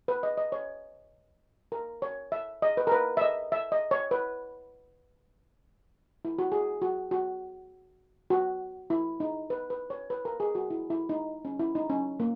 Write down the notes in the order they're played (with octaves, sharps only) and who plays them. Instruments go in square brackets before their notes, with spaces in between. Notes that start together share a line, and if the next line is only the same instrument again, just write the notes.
[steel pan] B4
D#5
D#5
C#5
A#4
C#5
E5
D#5
B4
A#4
B4
E5
D#5
E5
D#5
C#5
B4
E4
F#4
G#4
F#4
F#4
F#4
E4
D#4
B4
B4
C#5
B4
A#4
G#4
F#4
E4
E4
D#4
C#4
E4
D#4
C#4
A#3